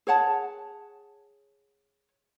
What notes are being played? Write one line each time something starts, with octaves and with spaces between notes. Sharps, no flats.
G#4 C#5 F#5 A5